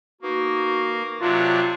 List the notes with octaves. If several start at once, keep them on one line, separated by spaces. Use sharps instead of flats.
A#3 B3 D#4 F#4
C3 F#3 D4 F4